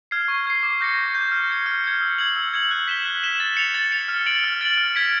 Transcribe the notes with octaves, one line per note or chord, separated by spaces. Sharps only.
F6 G#6 C7
C#6
F6 G#6 C7
D6
G6 A#6 C#7
D6
G6 A#6 C#7
F6
G#6 C#7
F6
G#6 C#7
E6
G#6 C#7 F#7
E6
G#6 C#7 F#7
F#6
B6 E7 G7
F#6
B6 E7 G7
A6
C#7 F7
A6
C#7 F7
F6
A6 D7 F#7
F6
A6 D7 F#7
F6
G#6 B6 D7